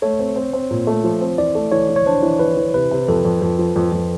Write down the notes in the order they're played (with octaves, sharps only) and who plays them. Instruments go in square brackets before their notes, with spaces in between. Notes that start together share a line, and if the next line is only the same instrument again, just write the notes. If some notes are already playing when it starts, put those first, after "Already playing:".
[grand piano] A3 [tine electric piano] C#5
[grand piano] C4
C4
C4
A#2
A3
F3
C4
[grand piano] E3 [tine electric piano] D5
[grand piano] A3
[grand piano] E3 [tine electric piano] C#5
[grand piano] E3
[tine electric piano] C#5
[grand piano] D4 [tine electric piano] C5
[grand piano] E3
[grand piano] E3 [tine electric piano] B4
[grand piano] E3
[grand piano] C3 [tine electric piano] B4
[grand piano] C3
[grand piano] F2 [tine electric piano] A4
[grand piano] F2
F2
F3
F2
F2